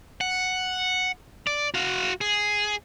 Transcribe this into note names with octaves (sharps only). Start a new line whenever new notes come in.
F#5
D5
F#4 F5
G#4